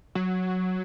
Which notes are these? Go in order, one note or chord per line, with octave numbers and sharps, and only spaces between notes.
F#3